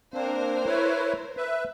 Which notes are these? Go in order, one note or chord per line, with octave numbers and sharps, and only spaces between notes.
A#3 C4 D4 A#4 C5
E4 B4 C#5
B4 E5